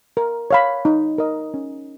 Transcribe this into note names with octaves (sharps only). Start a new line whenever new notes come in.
A#4
C#5 F5 B5
D#4
A#4 D#5
C#4